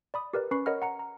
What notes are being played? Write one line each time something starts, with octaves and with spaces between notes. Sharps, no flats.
D5 B5 D#6
G4 A#4 B4 D5
C#4 B4 B5 C#6 C7
A#4 C#5 D#5 F#5 B5 F6
F#5 A#5 C#7
A#5